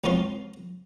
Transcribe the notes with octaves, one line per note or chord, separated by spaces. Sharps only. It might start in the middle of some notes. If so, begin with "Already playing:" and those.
C#2 C3 B3 C#4 F4 C6